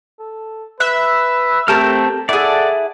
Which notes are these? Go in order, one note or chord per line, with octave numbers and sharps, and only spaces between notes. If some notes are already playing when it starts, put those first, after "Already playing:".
A4
B4 E5 F#6
A3 C4 G4 A4 A#4 A5 F6
E4 G#4 A4 D5 F#5